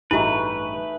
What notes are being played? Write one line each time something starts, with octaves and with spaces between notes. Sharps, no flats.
A1 G2 A3 D#4 E4 F#4 G#4 B4